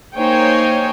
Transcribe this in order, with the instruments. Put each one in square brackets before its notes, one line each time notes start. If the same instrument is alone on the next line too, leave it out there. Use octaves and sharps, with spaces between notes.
[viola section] A#3 D#4 C5 C#5 G5 G#5